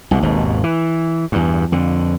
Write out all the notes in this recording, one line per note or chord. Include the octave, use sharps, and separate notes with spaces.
C2 B2
G#1 D#2 G#2 B2
E3
E2 G2
F2 D3